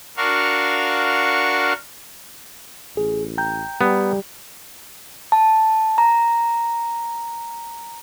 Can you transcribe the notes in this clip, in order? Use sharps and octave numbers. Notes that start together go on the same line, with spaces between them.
D4 F#4 A#4 F5 C#6
A1 G#4
G5 A#5 G6
G3 B3
A5
A#5